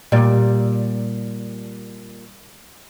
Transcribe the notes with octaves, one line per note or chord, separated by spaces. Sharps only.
A#2 G3 D5